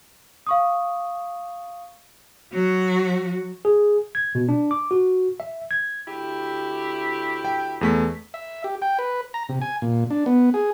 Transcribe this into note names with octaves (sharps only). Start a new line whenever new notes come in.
F5 C#6 D#6
F#3 F#4
G#4
G#6
B2
D4
D6
F#4
E5
G#6
D2 E4 G4
G5
E2 A3 B6
E5
G4
G5
B4
A#5
C3
G#5
A#2
D4
B3
G#4